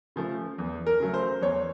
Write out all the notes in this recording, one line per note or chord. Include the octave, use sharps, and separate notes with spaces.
C#3 F3 A3
E2
A#4
C#3 F#3 A3
C5
E2 C#5